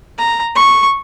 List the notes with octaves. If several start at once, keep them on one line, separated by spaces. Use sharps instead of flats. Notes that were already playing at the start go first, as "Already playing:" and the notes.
A#5
C#6